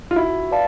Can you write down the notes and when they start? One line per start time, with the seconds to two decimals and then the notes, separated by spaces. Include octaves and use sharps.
0.11 F4
0.16 E4 F#4
0.51 B4 D5 F5 A5